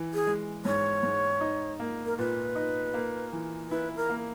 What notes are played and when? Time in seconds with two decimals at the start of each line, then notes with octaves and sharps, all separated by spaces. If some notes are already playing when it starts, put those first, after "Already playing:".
Already playing: E3
0.14 G#4
0.27 G#3
0.65 G#2 C#5
1.03 G#2
1.41 D#4
1.80 A#3
2.06 A#4
2.18 A#2 B4
2.55 D#4
2.94 A#3
3.33 E3
3.70 E4 B4
3.96 A#4
4.10 A#3